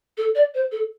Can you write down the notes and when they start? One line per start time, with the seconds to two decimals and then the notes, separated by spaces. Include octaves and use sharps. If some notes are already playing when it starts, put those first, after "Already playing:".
0.18 A4
0.35 D5
0.54 C5
0.72 A4